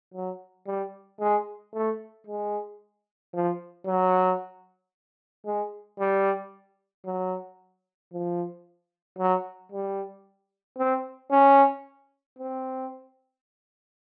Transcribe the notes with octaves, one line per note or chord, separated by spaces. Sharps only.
F#3
G3
G#3
A3
G#3
F3
F#3
G#3
G3
F#3
F3
F#3
G3
C4
C#4
C4